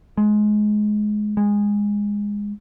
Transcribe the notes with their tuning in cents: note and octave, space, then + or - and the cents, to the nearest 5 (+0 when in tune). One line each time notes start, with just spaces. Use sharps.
G#3 +20
G#3 -15